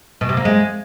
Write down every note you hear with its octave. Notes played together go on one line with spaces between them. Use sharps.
B2
C3
A#3
G#3